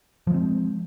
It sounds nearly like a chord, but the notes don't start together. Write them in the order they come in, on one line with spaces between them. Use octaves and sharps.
F3 G#3 C4